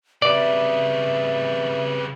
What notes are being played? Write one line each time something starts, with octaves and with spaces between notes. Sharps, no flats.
C#3 G3 C4 G4 B4 D5 E5